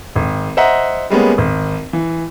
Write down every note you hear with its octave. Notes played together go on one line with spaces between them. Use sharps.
G#1
C5 D#5 E5 F#5 A#5
G3 G#3 A#3 B3 C#4
G#1
E3